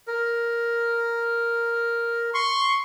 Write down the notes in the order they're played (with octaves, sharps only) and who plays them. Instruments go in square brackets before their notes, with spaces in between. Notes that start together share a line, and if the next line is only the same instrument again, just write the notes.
[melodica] A#4
[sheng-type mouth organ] C6 C#6